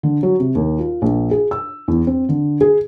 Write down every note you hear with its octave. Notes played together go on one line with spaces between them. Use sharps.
D3
F#3
C3
D#2
F4
A#1
G#4
E6
E2
C4
D3
G#4